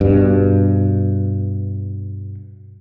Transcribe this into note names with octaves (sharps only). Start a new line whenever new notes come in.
G2 B2